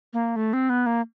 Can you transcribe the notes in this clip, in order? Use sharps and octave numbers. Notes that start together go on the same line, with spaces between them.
A#3
A3
C4
B3
A#3